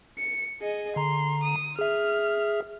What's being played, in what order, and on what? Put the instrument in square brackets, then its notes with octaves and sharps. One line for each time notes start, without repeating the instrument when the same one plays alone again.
[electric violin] C#7
G#4 D#5
[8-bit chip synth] D3 A#5 [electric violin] C6
[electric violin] D#6
[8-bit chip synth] G#4 E5 [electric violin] F6